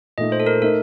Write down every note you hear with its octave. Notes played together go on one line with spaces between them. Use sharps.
A#2 A3 D#4 D#5
C5
A4
A#4
A3 D#4 A4 A#4